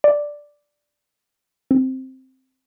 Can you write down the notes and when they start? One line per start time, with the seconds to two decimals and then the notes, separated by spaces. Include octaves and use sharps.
0.04 D5
1.71 C4